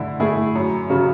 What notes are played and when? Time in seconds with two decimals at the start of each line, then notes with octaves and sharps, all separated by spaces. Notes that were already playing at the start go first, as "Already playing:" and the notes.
Already playing: D3 A3 E4
0.20 A3 E4 G#4
0.55 F#2
0.90 C#3 F#3